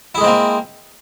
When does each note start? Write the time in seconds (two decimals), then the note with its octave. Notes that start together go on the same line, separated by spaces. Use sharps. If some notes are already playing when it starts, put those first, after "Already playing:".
0.15 E4
0.18 G#4
0.21 G#3
0.24 C4
0.26 A#3